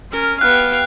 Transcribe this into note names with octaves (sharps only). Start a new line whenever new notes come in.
C#4 A#4 F6
B3 G4 F5 G5 F#6